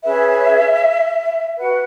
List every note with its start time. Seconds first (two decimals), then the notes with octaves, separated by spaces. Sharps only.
0.03 C#4 G#4 B4 E5
1.57 F#4 B4 F#5